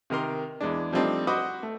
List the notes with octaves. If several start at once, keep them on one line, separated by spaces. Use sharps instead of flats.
C3 D#3 A#4 C6
E2 G#3 D4
F3 G3 A3 C4 D4 D#4
F#4 C5 D#5 B5 D6 D#6
A3